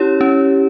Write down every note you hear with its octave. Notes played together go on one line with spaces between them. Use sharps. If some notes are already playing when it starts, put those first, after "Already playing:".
Already playing: C#4 E4 G4 C#5
C#4